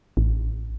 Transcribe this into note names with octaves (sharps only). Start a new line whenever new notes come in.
A1